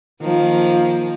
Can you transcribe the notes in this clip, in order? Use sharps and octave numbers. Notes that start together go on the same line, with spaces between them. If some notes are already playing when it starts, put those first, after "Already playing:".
D#3 F3 A#3